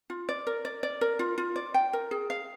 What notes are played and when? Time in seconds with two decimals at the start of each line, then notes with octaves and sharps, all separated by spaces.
0.10 F4
0.29 D5
0.47 A#4
0.65 D5
0.83 D5
1.01 A#4
1.19 F4
1.38 F4
1.56 D5
1.74 G5
1.93 A#4
2.11 G#4
2.30 F5